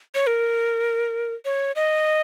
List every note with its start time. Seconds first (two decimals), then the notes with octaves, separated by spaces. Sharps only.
0.15 C#5
0.27 A#4
1.45 C#5
1.76 D#5